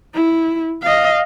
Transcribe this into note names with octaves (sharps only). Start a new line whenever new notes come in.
E4
D#5 F5